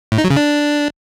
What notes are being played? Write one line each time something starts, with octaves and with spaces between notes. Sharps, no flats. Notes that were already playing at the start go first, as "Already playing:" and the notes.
A2
D#4
F#3
C#3
D4